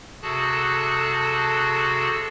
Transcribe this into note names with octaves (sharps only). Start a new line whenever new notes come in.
C3 F#4 G#4 A4 A5 F#6